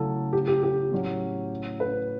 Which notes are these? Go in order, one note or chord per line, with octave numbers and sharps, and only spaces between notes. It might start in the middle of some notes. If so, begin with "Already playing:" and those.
Already playing: C#3 F#3 A3 C#4 E4 A4
G4
G4
G4
A2 F#3 C#4 F#4
B4